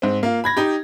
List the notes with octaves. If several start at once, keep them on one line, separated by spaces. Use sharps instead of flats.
G#2 C4
A#3 F4
B5 G#6 A#6
D#4 G4